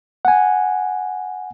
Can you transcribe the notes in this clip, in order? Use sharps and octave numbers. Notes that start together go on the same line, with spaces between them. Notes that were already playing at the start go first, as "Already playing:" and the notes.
F#5 G#5